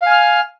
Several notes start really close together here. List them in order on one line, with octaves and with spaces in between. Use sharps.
F5 G#5 F6